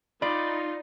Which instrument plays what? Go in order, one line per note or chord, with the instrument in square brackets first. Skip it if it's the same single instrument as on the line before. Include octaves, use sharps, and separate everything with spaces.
[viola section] D#4 [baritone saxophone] F4 [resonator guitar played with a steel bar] D5 [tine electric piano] B5